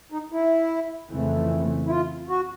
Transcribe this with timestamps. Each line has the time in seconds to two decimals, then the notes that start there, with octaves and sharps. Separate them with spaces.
0.12 D#4
0.32 E4
1.11 F2 C#3 E3 A3 C4
1.86 E4
1.89 F4
2.29 F#4